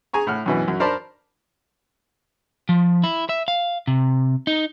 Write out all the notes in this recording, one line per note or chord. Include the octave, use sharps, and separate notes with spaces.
G#4 G#5 A#5 C#6
A2 F#5 F6
F#2 B2 E3
F#2 F#3
A#4 C5 D5 A5 B5
F3
E4
E5
F5
C3
D#4